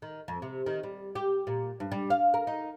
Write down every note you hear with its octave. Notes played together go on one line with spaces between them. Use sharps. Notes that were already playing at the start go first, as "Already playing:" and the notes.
D#3
F2
C3
D#3
G3
G4
A#2
G2
G3
F5
A#4
D#4